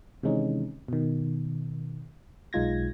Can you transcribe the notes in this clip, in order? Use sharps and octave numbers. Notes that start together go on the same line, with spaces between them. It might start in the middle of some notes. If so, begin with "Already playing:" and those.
C3 D#3 E3 G#3 C#4 D#4
B2 D#3
B1 G#3 D#4 F4 G#6 A#6